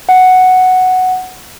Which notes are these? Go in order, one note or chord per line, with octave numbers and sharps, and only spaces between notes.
F#5